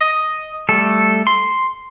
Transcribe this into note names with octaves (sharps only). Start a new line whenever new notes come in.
D#5
G3 A3 A4
C6